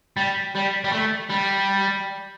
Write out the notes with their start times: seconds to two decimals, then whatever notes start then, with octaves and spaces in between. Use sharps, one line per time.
0.17 G3
0.55 G3
0.84 G3
0.92 A3
1.30 G3